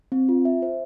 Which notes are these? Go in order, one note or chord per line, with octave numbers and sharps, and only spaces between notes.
C4
F4
E5
C5